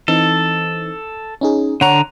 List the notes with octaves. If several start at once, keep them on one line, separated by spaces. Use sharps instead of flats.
E3 C4 D#4 A4
C#4 D#4 G#4
D3 C#5 F#5 A#5